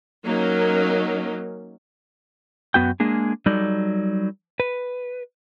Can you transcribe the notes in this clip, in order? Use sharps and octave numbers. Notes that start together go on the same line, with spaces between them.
F#3 A#3 C#4 D#4
F#2 B3 F#4 G5
G#3 A#3 D4 G#4
F#3 G3 D#4 A4 D5
B4